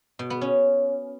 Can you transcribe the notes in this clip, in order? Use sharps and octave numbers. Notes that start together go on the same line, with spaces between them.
B2
B3
C#4